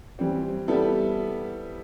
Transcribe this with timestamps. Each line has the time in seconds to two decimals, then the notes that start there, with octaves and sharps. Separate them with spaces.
0.19 E3 G3 C4
0.68 G3 B3 E4 A4